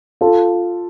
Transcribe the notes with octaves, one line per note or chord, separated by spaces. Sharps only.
F4 A4